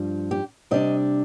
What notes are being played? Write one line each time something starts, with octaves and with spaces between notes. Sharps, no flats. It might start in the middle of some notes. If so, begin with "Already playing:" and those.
Already playing: G2 F3
G4
C3 G3 D4 D#5